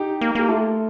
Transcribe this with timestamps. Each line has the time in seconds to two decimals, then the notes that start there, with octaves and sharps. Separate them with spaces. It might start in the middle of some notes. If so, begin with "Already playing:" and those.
Already playing: D#4 G4
0.21 A#3
0.35 A#3 G4
0.48 A3 F4 A4